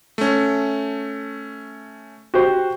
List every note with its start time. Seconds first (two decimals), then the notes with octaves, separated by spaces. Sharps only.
0.18 A3 C#4
2.34 F#4 G4 C5